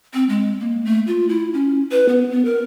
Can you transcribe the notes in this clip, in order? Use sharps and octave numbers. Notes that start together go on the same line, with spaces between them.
C4
G#3
A#3
A3
F4
E4
C#4
B4
B3
B3
A#4